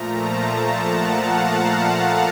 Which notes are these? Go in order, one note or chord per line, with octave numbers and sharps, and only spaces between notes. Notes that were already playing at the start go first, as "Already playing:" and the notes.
Already playing: A#2 F3 A3 A#5
A5
A5
F#5
F5
F#5